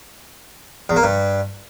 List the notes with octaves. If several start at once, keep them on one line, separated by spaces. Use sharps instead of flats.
E2
A#3
G2